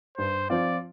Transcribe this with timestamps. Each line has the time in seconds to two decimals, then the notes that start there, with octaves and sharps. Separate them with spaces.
0.18 G2 C5
0.50 F3 C4 F4 D5